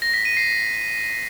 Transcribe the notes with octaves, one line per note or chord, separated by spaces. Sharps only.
A#6
B6
D#7
C7